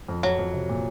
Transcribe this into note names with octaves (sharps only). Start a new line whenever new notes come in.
F2
F2 F#3
F2
C3
A#2